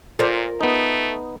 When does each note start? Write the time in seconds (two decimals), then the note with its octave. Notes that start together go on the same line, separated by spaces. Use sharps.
0.19 A#2 F4 A4 A#4 C5 D5
0.61 A3 B3 D#4